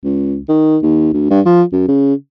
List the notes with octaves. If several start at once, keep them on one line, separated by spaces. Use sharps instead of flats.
C#2
D#3
D#2
D2
G2
F3
F#2
C#3